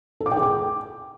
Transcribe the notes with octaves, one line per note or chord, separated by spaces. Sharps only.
A4
D6
G5
G#4
D6